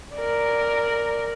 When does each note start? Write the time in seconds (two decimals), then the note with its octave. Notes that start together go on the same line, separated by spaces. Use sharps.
0.16 A#4 D5